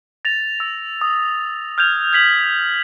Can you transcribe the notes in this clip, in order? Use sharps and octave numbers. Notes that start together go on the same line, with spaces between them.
A6 A#6 F7
E6
D#6
F6 G6 G#6 F7
G#6 B6 F#7